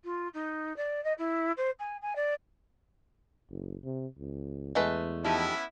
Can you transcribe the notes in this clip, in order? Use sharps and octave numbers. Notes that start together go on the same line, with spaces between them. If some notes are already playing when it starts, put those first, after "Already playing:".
F4
D#4
D5
D#5
E4
C5
G#5
G#5
D5
F#1
C3
C#2
E2 G#3 A3 B4
F3 B3 C#4 D#4 E4 G4